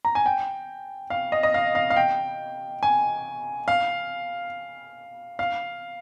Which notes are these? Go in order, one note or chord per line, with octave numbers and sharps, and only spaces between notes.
A#5
G#5
G5
F5
D#5
D#5
F5
F5
F5
G5
G#5
F5
F5